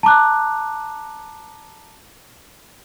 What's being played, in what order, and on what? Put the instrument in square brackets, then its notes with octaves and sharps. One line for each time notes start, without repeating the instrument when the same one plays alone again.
[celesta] A5 A#5 D6 F#6